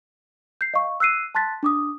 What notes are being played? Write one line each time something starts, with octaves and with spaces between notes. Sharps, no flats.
G6 C7
D#5 F5 C#6
E6 F#6 C7 D#7
A5 C6 F#6 A6 B6
D4 D6 D#6